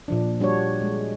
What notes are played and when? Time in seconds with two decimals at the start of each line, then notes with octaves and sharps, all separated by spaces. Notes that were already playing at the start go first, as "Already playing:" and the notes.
0.08 A#2 F3 D4
0.40 G3 D4 F#4 C#5
0.82 G#3